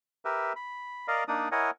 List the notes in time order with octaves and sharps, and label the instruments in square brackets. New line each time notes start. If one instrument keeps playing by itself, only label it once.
[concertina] G4 A#4 B4 E5
B5
A#4 D5 D#5 F5
A#3 D4 D#4 D5 D#6
E4 A#4 C#5 D#5 F#5 G#5